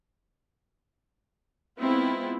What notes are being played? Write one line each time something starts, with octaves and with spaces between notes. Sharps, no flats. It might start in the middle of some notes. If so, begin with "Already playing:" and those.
G#3 B3 C4 E4 F4